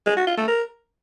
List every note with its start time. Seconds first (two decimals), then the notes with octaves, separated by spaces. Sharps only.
0.06 G#3
0.17 F#4
0.27 F4
0.37 A3
0.48 A#4